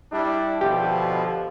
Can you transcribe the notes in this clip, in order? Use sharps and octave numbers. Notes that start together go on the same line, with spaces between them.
G3 D4 E4
B2 D3 F3 G4